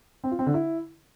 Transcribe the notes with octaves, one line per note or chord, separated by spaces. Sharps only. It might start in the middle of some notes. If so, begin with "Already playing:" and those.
C4
F4
C4
D3
E4